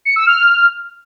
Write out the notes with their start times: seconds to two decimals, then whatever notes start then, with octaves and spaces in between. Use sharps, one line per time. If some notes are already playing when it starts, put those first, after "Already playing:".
0.05 C#7
0.16 E6
0.26 F6